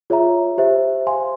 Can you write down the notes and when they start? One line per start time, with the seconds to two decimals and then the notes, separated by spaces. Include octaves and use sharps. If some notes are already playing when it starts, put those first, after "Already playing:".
0.10 F4 G#4 C#5 E5 A#5
0.58 G4 C5 E5
1.07 C5 F5 G#5 C6